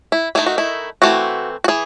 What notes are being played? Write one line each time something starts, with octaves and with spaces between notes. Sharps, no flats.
E4
D#3 A3 D#4 E4
F#4
E4
E3 A3 C4 F#4
F#4
E3 G#4